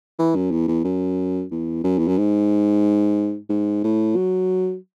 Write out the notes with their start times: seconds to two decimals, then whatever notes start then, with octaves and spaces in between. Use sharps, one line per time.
0.19 E3
0.35 F#2
0.51 E2
0.68 E2
0.85 F#2
1.51 E2
1.84 F#2
1.98 E2
2.08 F#2
2.18 G#2
3.50 G#2
3.84 A2
4.16 F#3